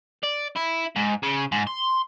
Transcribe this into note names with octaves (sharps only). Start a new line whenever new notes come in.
D5
E4
G#2
C#3
G#2
C6